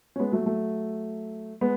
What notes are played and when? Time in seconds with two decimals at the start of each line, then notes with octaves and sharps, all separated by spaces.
0.16 C#4
0.19 G#3 B3
0.32 F#3 A3
0.46 F#3 A3
1.61 G#3 B3